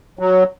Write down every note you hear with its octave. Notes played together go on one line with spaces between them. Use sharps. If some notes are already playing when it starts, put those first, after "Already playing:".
F#3